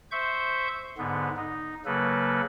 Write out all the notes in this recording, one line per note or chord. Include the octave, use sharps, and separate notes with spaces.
C5 E5 C#6 G6
G#2 D3 B3
D#4
C#3 F#3 A#3 A4 B4